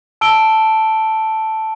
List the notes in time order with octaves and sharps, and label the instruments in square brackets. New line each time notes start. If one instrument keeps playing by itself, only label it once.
[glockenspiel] A5 E6 D7 G7